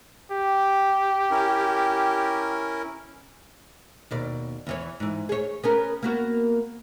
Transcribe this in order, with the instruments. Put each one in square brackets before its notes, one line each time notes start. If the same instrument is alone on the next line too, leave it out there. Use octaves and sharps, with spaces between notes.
[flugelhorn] G4
[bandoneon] C#4 E4 A#4
[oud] D#2 B2 D5
E2 E3 C#5
G#2 E3
G#4 C#5
B3 C#4 A#4
A#3 B3 F#4